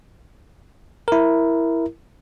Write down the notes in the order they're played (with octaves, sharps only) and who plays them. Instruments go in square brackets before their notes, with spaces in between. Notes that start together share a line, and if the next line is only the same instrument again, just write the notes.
[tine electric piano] E4 A#4